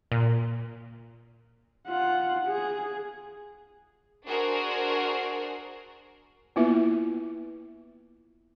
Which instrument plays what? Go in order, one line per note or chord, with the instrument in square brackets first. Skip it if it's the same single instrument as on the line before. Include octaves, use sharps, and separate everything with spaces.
[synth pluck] A#2
[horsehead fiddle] F4 F#5
G#4
[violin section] D4 F#4 G#4 A#4 C5
[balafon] A#3 B3 E4 F4 B4 E5